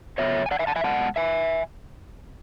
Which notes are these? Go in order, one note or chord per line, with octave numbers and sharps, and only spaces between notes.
C#3 F#3 B3 C#5 E5
G#5
D5 F#5
E5 G#5
F#5 A5
E5 G#5
B2 G#3 B3 F#5 A5
E5 G#5